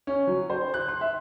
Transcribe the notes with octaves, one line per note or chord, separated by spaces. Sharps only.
C#4
F#3
C5
F#6
C6
E5